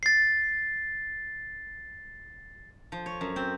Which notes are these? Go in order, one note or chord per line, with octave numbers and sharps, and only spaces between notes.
A6 C7
F3
C#5
F#2
C4